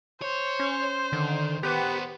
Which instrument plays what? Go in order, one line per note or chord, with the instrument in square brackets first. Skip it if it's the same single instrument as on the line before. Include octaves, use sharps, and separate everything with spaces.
[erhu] C5 [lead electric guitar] C#5
[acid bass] C#4
[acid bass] D3 [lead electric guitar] D#3
[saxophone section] B3 [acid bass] G4 [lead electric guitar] A#4 C5